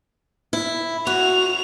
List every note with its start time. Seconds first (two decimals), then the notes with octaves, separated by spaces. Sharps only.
0.53 E4
1.07 F#4 F7